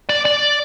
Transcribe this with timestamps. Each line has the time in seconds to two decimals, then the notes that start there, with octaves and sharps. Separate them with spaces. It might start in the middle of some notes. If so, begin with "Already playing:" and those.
0.09 D5
0.25 D5